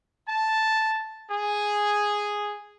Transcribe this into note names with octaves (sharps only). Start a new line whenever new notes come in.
A5
G#4